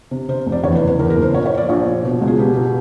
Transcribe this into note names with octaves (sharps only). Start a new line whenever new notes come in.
C3
C3 C5
F1
D5
E2 C#5
B4
F#1
B4
E2 A#4
A#4
F#1
C5
A#2 C#5
C#5
F3
D5
A#1 C#5
A#2
B2
C#2
G#4
B2 G4
B2